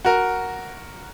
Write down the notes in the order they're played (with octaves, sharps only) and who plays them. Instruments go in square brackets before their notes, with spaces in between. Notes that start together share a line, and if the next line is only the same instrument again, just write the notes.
[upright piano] F#4 A#4